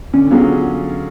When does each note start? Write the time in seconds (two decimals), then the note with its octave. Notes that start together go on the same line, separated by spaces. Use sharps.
0.13 D3 C#4
0.31 F#3 B3 C#4 F4 G#4